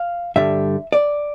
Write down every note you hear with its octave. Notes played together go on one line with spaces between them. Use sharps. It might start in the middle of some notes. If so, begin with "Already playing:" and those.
Already playing: F5
G2 D3 G3 E5
D5